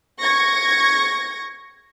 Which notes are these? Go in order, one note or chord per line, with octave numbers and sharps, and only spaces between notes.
C#6 G#6 A#6 C#7